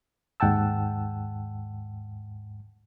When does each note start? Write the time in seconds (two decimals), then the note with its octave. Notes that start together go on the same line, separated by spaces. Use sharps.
0.40 D#2 G#2 F#5 G5 A5 E6